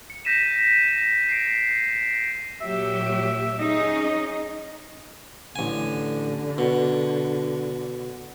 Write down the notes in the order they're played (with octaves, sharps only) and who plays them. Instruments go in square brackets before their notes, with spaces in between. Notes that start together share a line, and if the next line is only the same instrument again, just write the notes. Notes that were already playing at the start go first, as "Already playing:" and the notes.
[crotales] C#7
G6 A#6 B6 D#7 E7
C7 D7
[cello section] A#2 F#3 G4 [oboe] E5
[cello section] C#4 D#4 G#4 [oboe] D#5
[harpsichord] A1 G#5 [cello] D3
[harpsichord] B2